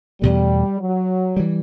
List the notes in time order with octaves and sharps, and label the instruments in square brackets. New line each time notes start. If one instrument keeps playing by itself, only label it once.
[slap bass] E2 B2 A3 [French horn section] G3
[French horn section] F#3
[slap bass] E3 G3